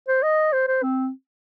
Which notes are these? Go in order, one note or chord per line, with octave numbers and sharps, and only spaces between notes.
C5
D#5
C5
C5
C4